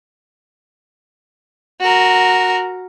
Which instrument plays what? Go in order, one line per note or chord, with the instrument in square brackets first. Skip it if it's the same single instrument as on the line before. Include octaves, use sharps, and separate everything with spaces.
[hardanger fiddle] F#4 A#4